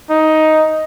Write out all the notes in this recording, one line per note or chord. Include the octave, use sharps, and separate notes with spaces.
D#4